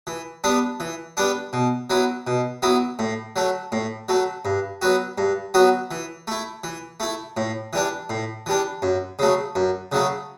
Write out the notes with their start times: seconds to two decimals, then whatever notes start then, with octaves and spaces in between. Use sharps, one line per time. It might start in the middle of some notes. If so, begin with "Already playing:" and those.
0.07 E3
0.44 G3 B3 D4
0.80 E3
1.17 G3 B3 D4
1.53 B2
1.90 F#3 B3 E4
2.27 B2
2.62 F#3 B3 E4
2.99 A2
3.36 F#3 A3
3.72 A2
4.09 F#3 A3
4.45 G2
4.82 F#3 B3 F#4
5.18 G2
5.54 F#3 B3 F#4
5.91 E3
6.27 A3 E4
6.64 E3
7.00 A3 E4
7.37 A2
7.73 E3 G3 D4
8.10 A2
8.46 E3 G3 D4
8.82 F#2
9.19 C#3 F#3 A3
9.55 F#2
9.92 C#3 F#3 A3